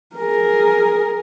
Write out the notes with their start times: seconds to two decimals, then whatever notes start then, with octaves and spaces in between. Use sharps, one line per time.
0.16 G#4 A#4